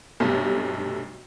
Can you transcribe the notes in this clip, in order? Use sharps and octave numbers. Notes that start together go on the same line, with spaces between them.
B1 G2 C3 A3